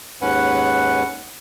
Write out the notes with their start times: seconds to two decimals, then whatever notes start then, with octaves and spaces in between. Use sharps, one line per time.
0.22 D#2 G#2 C#4 B4 F#5